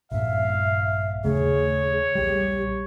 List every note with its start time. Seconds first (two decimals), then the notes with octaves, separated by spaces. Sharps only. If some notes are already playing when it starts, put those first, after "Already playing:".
0.12 A#1 G2 A#2 E5 F5
1.25 D#2 C#3 A3 G#4 C#5
2.15 A#1 G3 G4